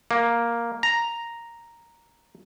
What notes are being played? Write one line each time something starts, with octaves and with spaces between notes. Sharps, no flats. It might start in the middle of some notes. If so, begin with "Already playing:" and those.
A#3
A#5